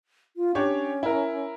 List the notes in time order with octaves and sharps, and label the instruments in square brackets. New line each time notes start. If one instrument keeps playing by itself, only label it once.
[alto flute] F4
[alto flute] C#4 [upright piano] D4 G4 C#5
[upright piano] E4 A#4